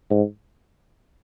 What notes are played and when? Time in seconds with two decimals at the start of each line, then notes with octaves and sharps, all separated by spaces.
0.11 G#2